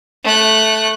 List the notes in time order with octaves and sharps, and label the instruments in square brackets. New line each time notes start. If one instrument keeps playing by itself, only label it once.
[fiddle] A3 F#6